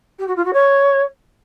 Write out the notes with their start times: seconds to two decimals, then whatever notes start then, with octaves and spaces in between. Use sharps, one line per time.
0.18 G4
0.27 F#4
0.36 F4
0.44 F#4
0.53 C#5